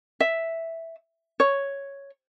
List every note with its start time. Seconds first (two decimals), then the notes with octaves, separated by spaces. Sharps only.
0.20 E5
1.40 C#5